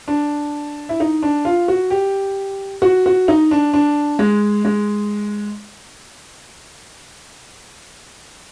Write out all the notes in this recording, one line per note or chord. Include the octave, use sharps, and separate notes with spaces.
D4
E4
D#4
D4
F4
F#4
G4
F#4
F#4
D#4
D4
D4
G#3
G#3